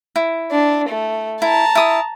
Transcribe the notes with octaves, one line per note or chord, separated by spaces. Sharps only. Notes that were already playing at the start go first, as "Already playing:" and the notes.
E4
D4
A3
E4 A5 A#5
E4 D#6